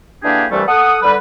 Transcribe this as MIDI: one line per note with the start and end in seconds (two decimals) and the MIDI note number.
0.24 0.46 50
0.24 0.46 52
0.24 0.46 58
0.24 0.46 62
0.24 0.46 67
0.24 0.46 68
0.52 0.62 36
0.52 0.62 43
0.52 0.62 52
0.52 0.62 55
0.52 0.62 57
0.68 0.98 69
0.68 0.98 78
0.68 0.98 87
1.03 1.15 50
1.03 1.15 55
1.03 1.15 71